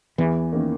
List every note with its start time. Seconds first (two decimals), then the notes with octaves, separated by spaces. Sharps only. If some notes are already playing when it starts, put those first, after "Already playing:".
0.18 E2 E3
0.52 D#3 A#3 C#4